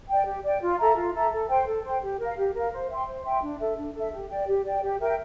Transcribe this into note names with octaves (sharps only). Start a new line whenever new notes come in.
D5 G5
G4
D5 G5
F4
A4 E5 A#5
F4
A4 E5 A#5
A4
C5 G5
A4
C5 G5
G4
A#4
F5
G4
A#4 F5
C5
E5 G5 C6
C5
E5 G5 C6
D4
A4 E5
D4
A4
E5
G4
D5 G5
G4
D5 G5
G4
A#4 E5 G5